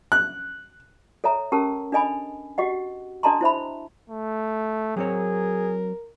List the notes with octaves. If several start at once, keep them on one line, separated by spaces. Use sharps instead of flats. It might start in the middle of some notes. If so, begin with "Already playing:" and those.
F#6
A4 C#5 E5 A#5
C#4 G4 A4 A#4 A5 E6
D4 A4 D#5 G#5 B5
F#4 G4 D#5 F#5
D4 A4 D#5 A5 A#5 C6
E4 C5 E5 B5
A3
F#3 C4 G#4 A#4 C#5